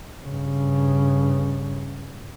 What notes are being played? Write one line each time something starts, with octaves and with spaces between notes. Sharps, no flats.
G2 C#3